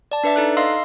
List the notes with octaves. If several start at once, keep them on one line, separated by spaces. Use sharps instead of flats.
D5 A5
D4 B4 D5 E5
D#4 A4 F#6
D#5 F5 C6 E6 C7